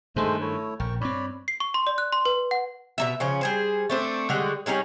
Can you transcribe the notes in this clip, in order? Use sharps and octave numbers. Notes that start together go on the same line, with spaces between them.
G2 D#3 G#3 A3 C5
A3 E4 C#5
A#1 A#4 G5 C#6
G2 C4 C#5 D5 B5
C7
C#6
C6
D5
F#6
C6
B4
F#5
B2 A#3 E5
C#3 F3 C#4
G3 G#4 C5
A3 C4 D4
D3 G3 G#3 F#4
G3 C#4 D#4 G#4